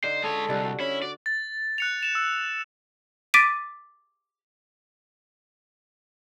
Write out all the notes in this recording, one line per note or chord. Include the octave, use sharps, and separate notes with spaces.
D3 D#4 C5
G#3 A4 C#5
C2 D3 G3 G#3
F#4
C#4 E4
F#4 D5
A6
F#6 C#7 F7
E7 F7
E6
D6 A6 B6 D7 D#7